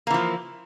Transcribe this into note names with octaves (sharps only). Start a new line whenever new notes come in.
E3 F3 A#3